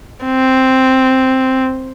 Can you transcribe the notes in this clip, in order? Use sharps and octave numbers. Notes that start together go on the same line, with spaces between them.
C4